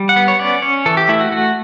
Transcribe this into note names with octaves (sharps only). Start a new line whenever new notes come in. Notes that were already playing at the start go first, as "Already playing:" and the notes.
Already playing: G3
F#5
B3
C#5
C#4 D5
C#4 C#5
E3 A4
G4
A3 E4
F#4
A3 F#4